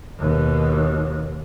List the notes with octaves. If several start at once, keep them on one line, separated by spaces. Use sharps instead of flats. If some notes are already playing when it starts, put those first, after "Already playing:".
D#2 B2